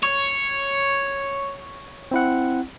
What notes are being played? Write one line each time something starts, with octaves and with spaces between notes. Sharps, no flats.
C#5
C4 E4 F#5